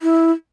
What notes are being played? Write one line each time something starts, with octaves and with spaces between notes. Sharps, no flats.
E4